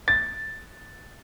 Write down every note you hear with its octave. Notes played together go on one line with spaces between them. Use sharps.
A6